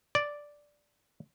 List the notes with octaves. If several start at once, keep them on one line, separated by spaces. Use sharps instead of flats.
D5